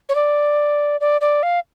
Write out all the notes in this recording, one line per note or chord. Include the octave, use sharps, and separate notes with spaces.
C#5
D5
D5
D5
F5